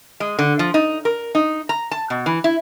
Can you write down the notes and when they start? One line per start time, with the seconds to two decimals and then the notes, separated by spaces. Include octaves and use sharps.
0.20 G#3
0.39 D3
0.59 F3
0.74 D#4
1.05 A#4
1.35 D#4
1.69 A#5
1.91 A5
2.10 B2
2.26 E3
2.44 E4